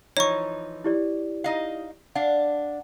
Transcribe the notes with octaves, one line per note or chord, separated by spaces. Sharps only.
E3 F3 D#4 C#5 C#6
E4 G4 D5
D#4 D#5 F5
D4 F5 F#5